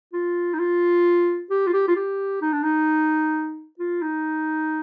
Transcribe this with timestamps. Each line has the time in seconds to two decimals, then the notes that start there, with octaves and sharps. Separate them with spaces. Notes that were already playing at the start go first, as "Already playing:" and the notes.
0.13 F4
0.54 D#4
0.59 F4
1.50 G4
1.67 F4
1.73 G4
1.88 F4
1.96 G4
2.42 D#4
2.52 D4
2.63 D#4
3.79 F4
4.02 D#4